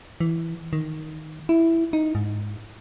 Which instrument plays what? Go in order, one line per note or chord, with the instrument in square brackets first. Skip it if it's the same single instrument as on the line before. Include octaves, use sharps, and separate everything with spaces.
[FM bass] E3
D#3
E4
D#4
G#2